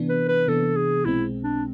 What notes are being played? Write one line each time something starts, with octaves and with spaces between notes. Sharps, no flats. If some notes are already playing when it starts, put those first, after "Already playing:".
Already playing: C3 E3 B3 D4
B4
B4
C3 E3 B3 D4 A4
G#4
B1 B2 G#3 C4 E4
D4